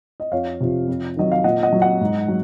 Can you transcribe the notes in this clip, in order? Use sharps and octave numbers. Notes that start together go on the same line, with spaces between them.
D#5
F2 C#5 F5
C3 F3
F2
D#3 F#3 D#5
F5
A#2 D#5 F#5
D#5 F#5
F#3
D#5 F#5
G#2
F#3